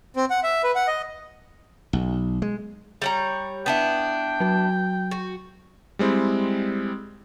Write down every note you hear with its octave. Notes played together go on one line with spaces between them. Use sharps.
C4
F#5
E5
B4
F#5
D#5
B1
G#3
G3 C#5 A#5
B3 D4 E4 G5
F#3 F#4
F#4
G3 G#3 C4 E4